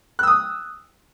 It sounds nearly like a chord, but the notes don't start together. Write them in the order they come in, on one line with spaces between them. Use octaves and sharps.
F#6 E6 D#6